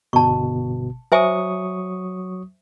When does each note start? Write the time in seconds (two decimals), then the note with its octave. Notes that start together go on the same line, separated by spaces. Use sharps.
0.13 G1 B2 A5 C#6
1.12 F#3 C5 E5 G#5 C#6 D#6